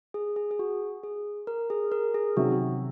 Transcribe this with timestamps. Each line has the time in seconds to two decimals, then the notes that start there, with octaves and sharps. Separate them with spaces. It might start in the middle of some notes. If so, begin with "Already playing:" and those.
0.14 G#4
0.36 G#4
0.51 G#4
0.59 F#4
1.03 G#4
1.47 A#4
1.70 G#4
1.92 A#4
2.14 G#4
2.36 C3 D#3 F#3 C#4 F#4